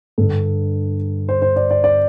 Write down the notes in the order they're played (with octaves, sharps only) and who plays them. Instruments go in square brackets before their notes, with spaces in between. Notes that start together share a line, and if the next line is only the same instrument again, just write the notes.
[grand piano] G2 D3 A4
C5
C5
D5
D5
D5